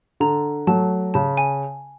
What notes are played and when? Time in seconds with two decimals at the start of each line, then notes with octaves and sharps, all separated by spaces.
0.20 D3 A#5
0.67 F#3 A3 A5
1.14 C#3 A5
1.37 G#5